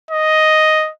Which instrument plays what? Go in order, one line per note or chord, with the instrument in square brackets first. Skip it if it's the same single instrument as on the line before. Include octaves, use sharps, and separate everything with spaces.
[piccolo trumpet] D#5